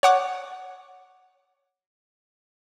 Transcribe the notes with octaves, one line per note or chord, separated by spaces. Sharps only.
C#5 F#5 D6